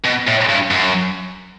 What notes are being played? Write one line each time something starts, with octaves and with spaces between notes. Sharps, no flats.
B2
A2
G2
F#2